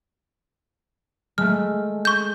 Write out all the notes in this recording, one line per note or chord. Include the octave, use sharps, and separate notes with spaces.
G#3 A3 F6
C#6 G6